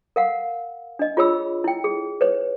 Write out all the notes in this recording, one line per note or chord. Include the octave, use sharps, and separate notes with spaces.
A#4 F5 F#5
D4 D#5
F4 G#4 C#5 B5 E6
E4 G5
G#4
B4 C#5